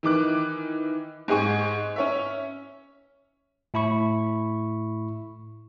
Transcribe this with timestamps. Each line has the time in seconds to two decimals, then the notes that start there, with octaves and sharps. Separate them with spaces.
0.03 D#3 E3 D6 F#6
1.28 G#2 G#3 G#4 G#5 C#6
1.96 C#4 C#5 E5
3.74 A2 E4 B5 C#6